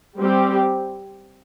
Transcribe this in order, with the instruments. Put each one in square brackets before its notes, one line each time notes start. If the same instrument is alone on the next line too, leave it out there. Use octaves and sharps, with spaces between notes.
[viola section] G3 C4 G4